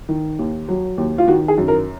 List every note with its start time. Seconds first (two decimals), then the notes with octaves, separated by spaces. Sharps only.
0.09 D#3
0.39 D#2
0.69 F#3
0.98 D#2
1.18 F4
1.28 D#3 F#4
1.48 G#4
1.58 F#2
1.68 A#4